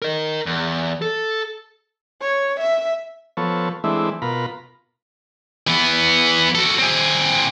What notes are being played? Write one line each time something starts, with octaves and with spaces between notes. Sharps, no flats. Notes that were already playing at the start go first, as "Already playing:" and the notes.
A#4 D#5
E2
A4
C#5
E5
F3 B3 A4 C#5
E3 G#3 A3 C4 D4 E4
B2 F4 A#4 B5
E3 B3
F#4 A4
C4 G#4